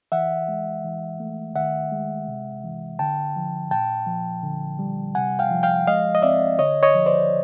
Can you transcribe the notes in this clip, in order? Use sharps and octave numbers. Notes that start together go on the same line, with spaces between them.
E3 E5 F#5
G#3
E3
A3
D#3 E5 F#5
G#3
C3
E3
D3 G5 A5
F3
A#2 G5 A5
F3
D3
G3
C3 F#5 G#5
F5 G5
F3
F5 G5
G#3 D#5 F5
D#5
C4 D5 E5
D3 C#5 D#5
C#5 D#5
F3
C5 D5